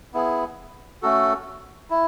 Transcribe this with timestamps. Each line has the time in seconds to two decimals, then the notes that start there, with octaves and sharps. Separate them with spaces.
0.14 B3 E4 G#4
1.02 A3 C#4 F#4 A4
1.90 E4